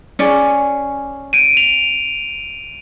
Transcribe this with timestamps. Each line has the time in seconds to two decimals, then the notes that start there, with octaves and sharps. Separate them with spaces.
0.19 C#4 G#4 D5
1.33 D7 D#7
1.57 F7